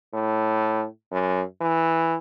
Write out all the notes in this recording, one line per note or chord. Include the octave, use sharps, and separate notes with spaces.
A2
F#2
E3